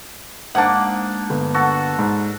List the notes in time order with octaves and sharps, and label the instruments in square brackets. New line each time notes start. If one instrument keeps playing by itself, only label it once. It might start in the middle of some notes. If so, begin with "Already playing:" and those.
[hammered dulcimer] G#2 A#3 D4 [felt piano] F#5 A5
[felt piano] G1
[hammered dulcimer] F#4 A4
[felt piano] G#2